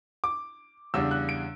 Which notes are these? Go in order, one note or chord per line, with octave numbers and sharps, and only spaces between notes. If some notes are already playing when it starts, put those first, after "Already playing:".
D6
E2 C#3 G3 D4 E6
F#6
D7